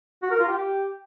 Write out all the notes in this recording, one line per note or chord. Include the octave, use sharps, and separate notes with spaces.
F#4
A#4
F4
G4